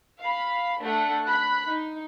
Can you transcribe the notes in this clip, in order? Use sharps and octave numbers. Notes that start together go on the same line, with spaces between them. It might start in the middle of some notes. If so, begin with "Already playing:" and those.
F5 B5
A3 D4 F#5
B5 F#6
D#4